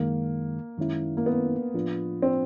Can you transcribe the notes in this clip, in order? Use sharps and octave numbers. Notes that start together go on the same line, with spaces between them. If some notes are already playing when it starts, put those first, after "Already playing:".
Already playing: F#2 D#3 G#3 A#3
F#2 D#3 G#3 C#4 E4
A#3
B3
A2 F3 A#3 D4 F4
C4